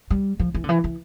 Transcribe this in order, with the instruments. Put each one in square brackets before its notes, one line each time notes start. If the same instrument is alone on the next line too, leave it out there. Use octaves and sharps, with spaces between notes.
[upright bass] G3
F3
E3
D3
E3
E3